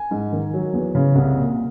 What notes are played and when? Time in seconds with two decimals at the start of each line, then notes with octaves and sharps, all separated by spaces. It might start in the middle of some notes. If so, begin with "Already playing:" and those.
Already playing: G#5
0.11 G#2
0.32 D#3
0.54 F#3
0.73 E2
0.95 C#3
1.15 C2
1.36 A#2